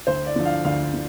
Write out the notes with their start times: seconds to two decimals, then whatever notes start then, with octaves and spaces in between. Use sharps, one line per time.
0.07 D2 C5
0.26 D5
0.36 D3 F3
0.45 F5
0.65 D2 F5
0.94 D3